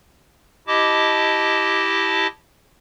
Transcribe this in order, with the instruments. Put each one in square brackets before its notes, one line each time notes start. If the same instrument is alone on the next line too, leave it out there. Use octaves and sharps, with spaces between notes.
[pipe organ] E4 G4 D#5 A5 D6